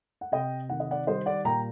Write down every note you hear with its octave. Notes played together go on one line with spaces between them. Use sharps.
F#5
C3 D#5 G5
D#3 F#5
D#5
D5 F#5
G3 C5 D#5
D5 F#5
A#2 G5 A#5